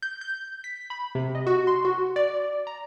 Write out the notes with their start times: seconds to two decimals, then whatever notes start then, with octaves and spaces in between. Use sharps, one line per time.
0.03 G6
0.21 G6
0.64 B6
0.90 B5
1.15 C3
1.35 D#5
1.47 F#4
1.67 C6
1.85 F#4
2.16 D5
2.67 A#5